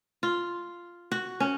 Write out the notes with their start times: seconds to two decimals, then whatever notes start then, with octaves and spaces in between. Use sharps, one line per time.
0.23 F4
1.11 F#4
1.40 C#4